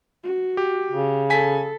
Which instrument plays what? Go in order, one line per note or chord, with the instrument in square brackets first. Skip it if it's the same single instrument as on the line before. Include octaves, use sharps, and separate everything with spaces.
[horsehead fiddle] F#4
[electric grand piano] G4
[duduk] C#3
[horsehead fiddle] A4 [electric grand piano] G#5 B6